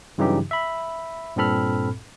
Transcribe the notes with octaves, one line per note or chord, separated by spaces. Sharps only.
G2 C#3 E3 F#3 D#4 G4
E5 B5
G2 A#2 C4 A4 B5 F6